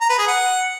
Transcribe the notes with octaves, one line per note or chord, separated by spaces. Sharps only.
A#5
B4
G#4
F#5